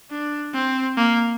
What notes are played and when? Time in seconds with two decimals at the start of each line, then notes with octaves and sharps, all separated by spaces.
0.10 D4
0.54 C4
0.97 A#3